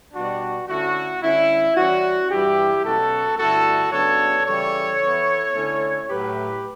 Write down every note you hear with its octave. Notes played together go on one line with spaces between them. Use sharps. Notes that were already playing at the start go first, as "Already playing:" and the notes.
B2 G3 D4 F#4
D3 A3 C#4 E4 F#4
D3 G3 C#4 E4
E3 G3 C#4 F#4
G2 E3 G3 E4 G4
B2 F#3 A3 C#4 F#4 A4
G2 D3 A3 E4 F#4 A4
C#3 F#3 B3 D4 A4 C#5
C#3 E3 G3 A4 C#5
E3 B3 E4
D3 A3 C#4 E4
A2 F#3 A3 G4 B4